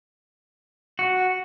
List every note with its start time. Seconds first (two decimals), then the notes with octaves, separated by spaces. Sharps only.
0.99 F#4